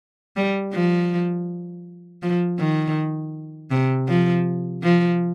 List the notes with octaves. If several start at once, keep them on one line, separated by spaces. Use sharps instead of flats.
G3
F3
F3
D#3
C3
F3
F3